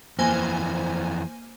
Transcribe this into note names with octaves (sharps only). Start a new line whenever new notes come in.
F2 E3 A#3 C5 G#5